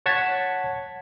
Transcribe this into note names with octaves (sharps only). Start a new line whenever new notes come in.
C#5 F#5 A5 G#6 B6